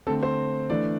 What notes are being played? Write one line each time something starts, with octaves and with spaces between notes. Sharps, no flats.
D3 A3 C4 A4
C5
E3 A3 D4 D5